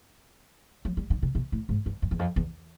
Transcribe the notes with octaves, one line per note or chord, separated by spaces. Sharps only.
F#3
G3
D3
C3
B2
A2
G#2
G2
F#2
E2
F2
E2